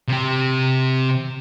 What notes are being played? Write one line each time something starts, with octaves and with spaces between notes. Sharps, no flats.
C3 G4